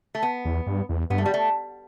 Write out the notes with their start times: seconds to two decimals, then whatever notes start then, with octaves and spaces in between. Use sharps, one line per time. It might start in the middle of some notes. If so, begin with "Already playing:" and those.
0.15 A3
0.23 B3
0.45 E2
0.66 G2
0.89 E2
1.10 G2 B3
1.18 A3
1.26 G3
1.34 A3